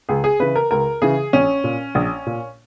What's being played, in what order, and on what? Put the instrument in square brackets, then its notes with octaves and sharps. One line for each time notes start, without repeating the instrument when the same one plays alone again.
[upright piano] C#2 G#4
G#4
C#3 E3 B4
A#4
C#2 A#4
C#3 E3 G#4
A#1 C#4
A#2
A#1
A#2